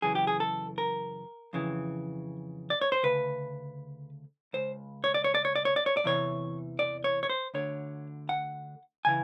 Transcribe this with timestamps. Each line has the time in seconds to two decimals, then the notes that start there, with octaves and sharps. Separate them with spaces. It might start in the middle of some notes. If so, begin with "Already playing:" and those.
0.02 F#2 C#3 E3 G#4
0.15 G4
0.27 G#4
0.40 A4
0.78 A#4
1.53 F2 C#3 E3
2.70 D5
2.81 C#5
2.92 C5
3.03 D2 C#3 B4
4.53 C#2 C#3 C5
5.04 C#5
5.14 D5
5.24 C#5
5.35 D5
5.45 C#5
5.55 D5
5.65 C#5
5.76 D5
5.86 C#5
5.97 D5
6.04 E2 C3 E3 C#5
6.79 D5
7.04 C#5
7.23 C#5
7.29 C5
7.54 D2 D3 C#5
8.29 F#5
9.05 C#3 E3 G#5